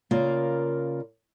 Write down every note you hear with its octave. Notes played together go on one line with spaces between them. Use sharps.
C#3 A#3 F4 A#4 D5